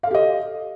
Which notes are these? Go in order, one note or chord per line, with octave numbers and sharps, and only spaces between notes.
G4 A4 D#5 F5